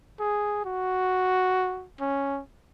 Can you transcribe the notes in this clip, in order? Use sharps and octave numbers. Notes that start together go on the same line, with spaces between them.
G#4
F#4
C#4